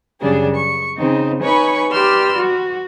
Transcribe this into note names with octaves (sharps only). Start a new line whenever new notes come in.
F#2 C#3 G3 D4 G#4
C#6
C#3 C4 D#4
D#4 B4 C#5 G#5 B5 C#6
G4 B4 D5 C6 E6 F6
F#4